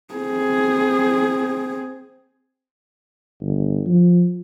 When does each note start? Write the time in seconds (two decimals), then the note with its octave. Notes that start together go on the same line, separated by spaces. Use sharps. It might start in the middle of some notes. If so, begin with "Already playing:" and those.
0.14 C4 G#4
3.41 G1
3.87 F3